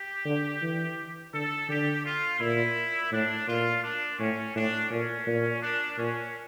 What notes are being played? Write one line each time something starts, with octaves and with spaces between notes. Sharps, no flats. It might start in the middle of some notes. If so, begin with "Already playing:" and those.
Already playing: G4
D3
E3
D3 A4
D3 G4
F4
A#2 E4
A2 D4
A#2 F4
D4
A2 C#4
A2 D4
A#2 C#4
A#2
D4
A#2 C#4